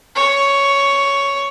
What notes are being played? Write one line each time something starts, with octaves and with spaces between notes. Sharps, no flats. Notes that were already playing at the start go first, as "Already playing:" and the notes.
C#5